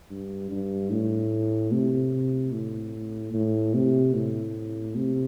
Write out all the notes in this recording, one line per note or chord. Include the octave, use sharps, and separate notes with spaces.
G2
G2
A2
C3
A2
A2
C3
A2
C3